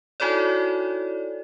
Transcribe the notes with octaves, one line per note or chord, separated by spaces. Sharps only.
D#4 E4 F#4 A4 C#5 D5